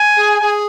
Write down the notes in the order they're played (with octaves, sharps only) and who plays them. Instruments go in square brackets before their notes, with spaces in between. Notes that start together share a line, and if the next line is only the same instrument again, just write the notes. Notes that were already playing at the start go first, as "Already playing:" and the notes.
Already playing: [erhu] G#5
[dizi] G#4
G#4